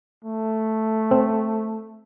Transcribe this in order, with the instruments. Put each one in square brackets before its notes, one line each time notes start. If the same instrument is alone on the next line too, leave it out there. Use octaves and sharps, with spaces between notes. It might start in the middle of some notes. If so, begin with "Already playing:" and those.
[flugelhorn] A3
[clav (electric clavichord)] C4